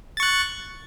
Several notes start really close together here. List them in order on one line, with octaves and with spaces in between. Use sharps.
A6 C#6 F#6